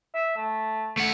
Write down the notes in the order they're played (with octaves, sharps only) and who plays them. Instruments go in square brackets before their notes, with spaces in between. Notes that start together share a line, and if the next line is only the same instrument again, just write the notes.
[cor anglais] E5
A3
[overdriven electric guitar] A3 F#5